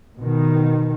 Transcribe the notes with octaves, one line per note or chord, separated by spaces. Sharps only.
B2 D#3